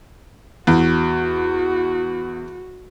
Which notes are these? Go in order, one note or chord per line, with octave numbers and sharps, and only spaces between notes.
E2 F#4